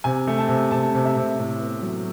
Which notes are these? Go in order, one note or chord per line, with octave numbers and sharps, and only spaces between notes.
C3 G#5
A3
A5
C3
C3 A5
C3
E5
C3
A2
B3
F#3